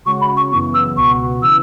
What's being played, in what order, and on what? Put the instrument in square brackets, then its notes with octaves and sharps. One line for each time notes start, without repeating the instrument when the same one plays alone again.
[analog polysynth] C#3 G#3 C#4 F#4 [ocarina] C#6
[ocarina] B5
C#6
[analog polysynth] F#2 C#3 E3 B3 [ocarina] C#6
[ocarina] E6
[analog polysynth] C#2 B2 B3 F#4 [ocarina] C#6
[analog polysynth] C#3 E3 [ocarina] E6